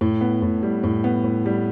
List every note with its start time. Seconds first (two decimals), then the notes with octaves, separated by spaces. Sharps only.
0.01 A2
0.21 B3
0.42 A2
0.63 G3
0.83 A2
1.04 B3
1.24 A2
1.46 G3